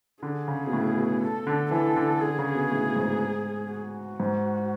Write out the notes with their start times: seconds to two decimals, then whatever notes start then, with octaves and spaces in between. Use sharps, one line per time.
0.23 D3 G#4
0.48 C#3
0.67 B2
0.73 A2
0.98 B2
1.22 A4
1.47 D3
1.71 E3 A4
1.96 D3
2.21 D3 G#4
2.39 C#3
2.55 B2
2.72 A2
2.96 G#2
3.70 F#4
4.20 G#2